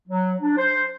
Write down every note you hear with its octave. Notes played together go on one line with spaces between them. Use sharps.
F#3
D4
C5